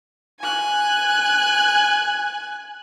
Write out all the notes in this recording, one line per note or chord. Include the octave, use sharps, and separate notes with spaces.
G#5 F#6